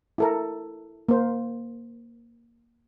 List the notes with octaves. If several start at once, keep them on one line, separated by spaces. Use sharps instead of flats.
E4 A4 A#4
A#3 C5